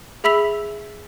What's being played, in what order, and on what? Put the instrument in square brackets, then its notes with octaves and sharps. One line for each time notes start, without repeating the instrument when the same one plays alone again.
[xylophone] G#4 E5 B5 E6 B6 F7